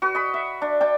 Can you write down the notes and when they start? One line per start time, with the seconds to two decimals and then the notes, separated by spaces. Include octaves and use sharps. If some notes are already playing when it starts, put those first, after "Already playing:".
0.02 F#4 B4
0.15 D#5 B5
0.34 E5
0.62 D4
0.81 D4 G5 A5